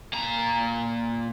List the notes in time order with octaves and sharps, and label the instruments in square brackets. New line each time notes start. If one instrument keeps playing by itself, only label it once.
[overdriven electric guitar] A#2 A#5